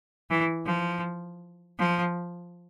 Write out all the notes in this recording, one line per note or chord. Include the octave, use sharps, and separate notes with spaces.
E3
F3
F3